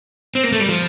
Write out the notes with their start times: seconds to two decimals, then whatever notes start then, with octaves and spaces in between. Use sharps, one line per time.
0.35 C4
0.43 A#3
0.52 A3
0.60 G3
0.69 F3